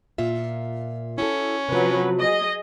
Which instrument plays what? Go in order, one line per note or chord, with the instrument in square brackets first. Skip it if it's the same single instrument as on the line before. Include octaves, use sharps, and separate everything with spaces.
[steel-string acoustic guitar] A#2 F4 E5
[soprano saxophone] C#4 [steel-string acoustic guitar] E4 F#4 A4
[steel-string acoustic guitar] C3 F3 [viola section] F#3 B4
[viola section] G#4 D#5